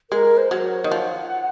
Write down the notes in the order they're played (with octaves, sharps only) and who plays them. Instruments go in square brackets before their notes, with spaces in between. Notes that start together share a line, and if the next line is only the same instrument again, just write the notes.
[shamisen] G#3 [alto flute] A#4
[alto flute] C5
[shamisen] F#3
[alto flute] C#5
[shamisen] D#3
[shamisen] F3 [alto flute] F#5